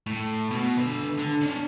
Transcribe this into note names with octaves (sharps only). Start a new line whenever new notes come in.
A2
B2
D3 B4
D3
C#4 D4